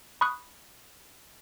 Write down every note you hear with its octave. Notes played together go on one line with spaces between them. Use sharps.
B5 C#6 D#6 F#6